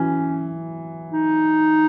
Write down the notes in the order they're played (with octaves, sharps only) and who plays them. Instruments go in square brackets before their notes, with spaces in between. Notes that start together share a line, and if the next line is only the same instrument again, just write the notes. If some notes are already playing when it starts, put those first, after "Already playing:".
Already playing: [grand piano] E3 F#3 [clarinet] C#4
[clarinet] D#4